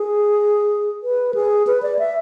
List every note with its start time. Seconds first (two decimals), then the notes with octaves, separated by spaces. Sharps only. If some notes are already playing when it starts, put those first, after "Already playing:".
Already playing: G#4
1.03 B4
1.34 G#4
1.67 B4
1.82 D5
1.99 E5